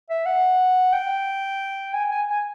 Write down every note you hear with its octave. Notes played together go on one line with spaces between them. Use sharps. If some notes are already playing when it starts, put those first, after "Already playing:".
E5
F#5
G5
G#5
G#5
G#5